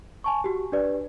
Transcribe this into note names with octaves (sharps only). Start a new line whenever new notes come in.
G#5 A5 C#6
F#4 G4
D4 G4 B4 D5